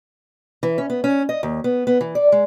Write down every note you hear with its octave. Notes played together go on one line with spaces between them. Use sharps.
E3
C#4
B3
C#4
D#5
D#2
B3
B3
E3
D5
G#3